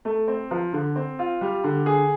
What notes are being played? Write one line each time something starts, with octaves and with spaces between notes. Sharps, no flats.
A3
C4
F3
D3
C4
F4
G3
D3
G#4